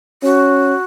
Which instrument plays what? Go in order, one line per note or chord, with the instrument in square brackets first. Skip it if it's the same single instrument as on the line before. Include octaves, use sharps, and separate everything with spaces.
[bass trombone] C#4 [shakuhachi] F#4